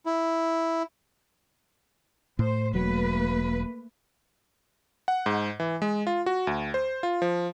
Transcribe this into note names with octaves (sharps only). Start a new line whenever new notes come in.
E4
A2 C5
E1 F#3 A3 A#3 B4
F#5
G#2
E3
G#3
F4
F#4
D2
C5
F4
F3